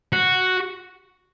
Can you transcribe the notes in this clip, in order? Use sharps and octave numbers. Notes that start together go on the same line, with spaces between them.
F#4